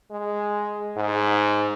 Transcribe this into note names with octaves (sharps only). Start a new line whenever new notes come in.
G#3
G#2